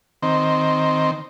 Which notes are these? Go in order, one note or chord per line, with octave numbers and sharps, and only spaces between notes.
D#3 C4